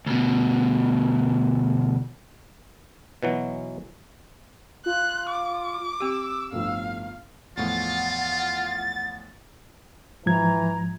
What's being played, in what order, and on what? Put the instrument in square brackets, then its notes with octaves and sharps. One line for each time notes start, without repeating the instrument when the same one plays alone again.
[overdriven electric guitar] D2 B2
[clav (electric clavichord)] B2 E3 F#3
[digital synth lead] F4 [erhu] F#6
[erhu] D6
[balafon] C4 G4 [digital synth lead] E6
[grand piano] G1 A2 F3 [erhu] F5
[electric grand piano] E2 A2 F3 [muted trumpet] F4 [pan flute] F#5 [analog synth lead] A6
[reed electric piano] G#2 F3 G#6 [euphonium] E3 [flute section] A#5